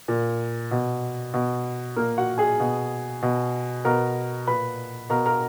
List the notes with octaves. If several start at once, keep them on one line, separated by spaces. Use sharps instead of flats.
A#2
B2
B2
A#2 A#3 A#4
F#4 F#5
G#4 G#5
B2
B2
B2 A#4 A#5
A#2 B4 B5
B2 A#4 A#5
A#4 A#5